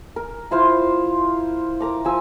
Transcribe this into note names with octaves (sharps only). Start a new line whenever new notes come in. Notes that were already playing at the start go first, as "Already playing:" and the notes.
A#4
E4 F4 C5 F5
A#4 A#5 D6
F3 G#5 E6